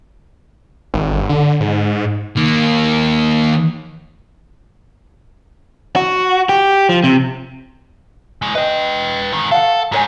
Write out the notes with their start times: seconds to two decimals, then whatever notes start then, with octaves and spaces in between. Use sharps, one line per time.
0.94 G#1
1.11 G1
1.29 D3
1.60 G#2
2.37 D#3 A#3
5.96 F#4
6.49 G4
6.89 F3
7.04 C3
8.42 A2 G#3
8.55 B4 D#5 G5
9.32 G#2 D#3
9.51 A4 F5 F#5
9.92 G#2 A4 C#5 G#5